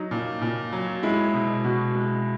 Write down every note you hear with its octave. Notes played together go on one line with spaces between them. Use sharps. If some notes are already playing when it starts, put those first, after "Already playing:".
Already playing: F#3 D#4
A#2
A#2
F#3
G#3 E4
B2
B2 F#4
G#3